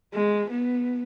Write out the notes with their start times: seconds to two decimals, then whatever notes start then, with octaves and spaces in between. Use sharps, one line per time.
0.14 G#3
0.51 B3